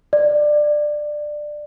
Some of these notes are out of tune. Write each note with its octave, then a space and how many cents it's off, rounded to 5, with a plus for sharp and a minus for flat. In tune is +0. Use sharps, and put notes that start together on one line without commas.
D5 +20